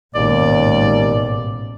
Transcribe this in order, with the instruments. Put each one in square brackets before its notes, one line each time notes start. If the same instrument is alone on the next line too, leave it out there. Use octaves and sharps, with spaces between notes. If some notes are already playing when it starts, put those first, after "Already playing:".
[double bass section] A1 G#2 B2 [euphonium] D#2 [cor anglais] D5